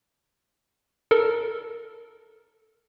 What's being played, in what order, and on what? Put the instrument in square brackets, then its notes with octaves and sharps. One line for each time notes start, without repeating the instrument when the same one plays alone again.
[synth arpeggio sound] A4 A#4